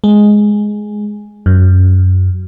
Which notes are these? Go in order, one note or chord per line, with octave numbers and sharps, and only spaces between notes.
G#3
F#2